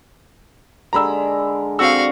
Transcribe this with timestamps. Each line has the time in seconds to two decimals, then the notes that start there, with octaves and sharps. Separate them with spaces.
0.93 D3 G#3 A#4 A#5 B5 E6
1.79 D3 C4 F#4 F5 E6